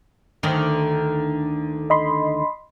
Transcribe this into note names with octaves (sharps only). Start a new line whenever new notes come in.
D2 D3 D#3
D#5 B5 C6